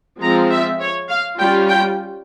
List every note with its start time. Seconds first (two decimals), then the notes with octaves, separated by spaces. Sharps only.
0.22 F3 G#3 C4 F4 A#5
0.51 E5
0.80 C#5
1.09 F5
1.38 G3 C#4 F4 G5
1.68 G5